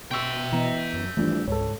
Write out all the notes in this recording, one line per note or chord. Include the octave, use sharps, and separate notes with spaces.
B2 E5 G5 C6 C#6 E6
E3 B3 D#5 A#5
F#2
G#1 E3 F3 G3 A3 B3 D4
C#2 G#2 A4 C#5